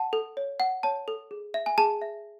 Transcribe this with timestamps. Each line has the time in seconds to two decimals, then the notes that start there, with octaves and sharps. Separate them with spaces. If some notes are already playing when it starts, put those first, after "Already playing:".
Already playing: F#5 A5
0.13 A4
0.37 C#5
0.60 F#5
0.83 C#5 A5
1.08 A4
1.31 G#4
1.54 E5
1.66 G#5
1.78 G#4 A5
2.02 E5